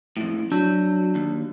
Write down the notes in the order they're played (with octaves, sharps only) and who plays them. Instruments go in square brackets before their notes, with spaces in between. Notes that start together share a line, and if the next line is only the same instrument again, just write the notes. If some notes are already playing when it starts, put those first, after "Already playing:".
[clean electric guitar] F2 A2
[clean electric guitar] F#3 [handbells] D4
[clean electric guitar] D#2